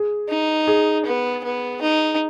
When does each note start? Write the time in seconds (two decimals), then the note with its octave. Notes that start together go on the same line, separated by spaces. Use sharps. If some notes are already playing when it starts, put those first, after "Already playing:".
Already playing: G#4
0.29 D#4
0.67 G#4
1.05 B3
1.44 B3
1.82 D#4